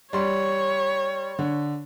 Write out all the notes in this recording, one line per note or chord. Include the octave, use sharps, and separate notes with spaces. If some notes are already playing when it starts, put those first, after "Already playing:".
G3 C#5 C6
D3